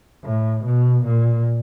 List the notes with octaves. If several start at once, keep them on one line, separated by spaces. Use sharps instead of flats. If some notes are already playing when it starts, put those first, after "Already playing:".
A2
B2
A#2